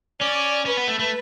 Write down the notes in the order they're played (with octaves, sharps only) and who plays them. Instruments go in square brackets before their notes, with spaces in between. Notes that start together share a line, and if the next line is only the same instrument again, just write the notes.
[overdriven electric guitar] C#4 [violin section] D5
[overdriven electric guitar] C#4 [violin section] B4
[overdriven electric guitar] B3
A3
A3